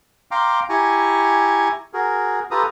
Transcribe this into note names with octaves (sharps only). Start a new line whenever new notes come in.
F5 G5 A#5 C6 D6
E4 G4 G#5 A#5 C#6
F#4 G#4 A#4
F4 G4 A4 B4 A#5 D#6